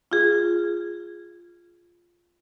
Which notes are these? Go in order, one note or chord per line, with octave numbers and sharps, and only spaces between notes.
F4 G#4